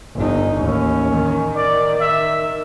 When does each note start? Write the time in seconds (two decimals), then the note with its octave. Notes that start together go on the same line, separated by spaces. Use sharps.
0.15 G1 D#4
0.56 A1 D#2 C#4
1.12 D#3
1.56 D5
2.01 E5